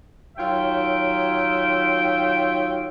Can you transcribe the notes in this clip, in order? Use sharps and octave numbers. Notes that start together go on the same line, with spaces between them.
D#3 F#3 F4 C#5 E5 G5